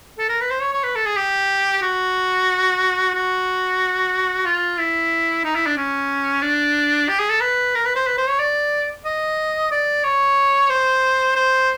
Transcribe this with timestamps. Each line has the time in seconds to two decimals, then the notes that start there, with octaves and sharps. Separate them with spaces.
0.19 A4
0.29 A#4
0.41 B4
0.51 C5
0.61 C#5
0.73 C#5
0.84 B4
0.95 A4
1.06 G#4
1.16 G4
1.82 F#4
3.14 F#4
4.46 F4
4.79 E4
5.44 D#4
5.55 E4
5.66 D4
5.77 C#4
6.42 D4
7.08 G4
7.19 G#4
7.30 A4
7.41 B4
7.75 A#4
7.85 B4
7.95 C5
8.07 B4
8.18 C5
8.29 C#5
8.39 D5
9.05 D#5
9.71 D5
10.04 C#5
10.70 C5
11.36 C5